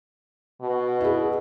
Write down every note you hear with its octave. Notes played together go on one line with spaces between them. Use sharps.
B2
E4 G#4